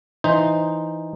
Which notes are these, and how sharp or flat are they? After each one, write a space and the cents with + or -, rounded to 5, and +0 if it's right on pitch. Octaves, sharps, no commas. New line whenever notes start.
E3 +0 D#4 +0 C5 +0